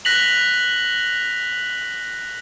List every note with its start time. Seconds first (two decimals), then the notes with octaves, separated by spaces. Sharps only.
0.05 F#6 A#6 B6 F7 F#7